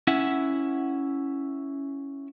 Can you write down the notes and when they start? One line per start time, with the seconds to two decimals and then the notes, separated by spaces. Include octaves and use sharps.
0.07 C#4 E4 E5 F#5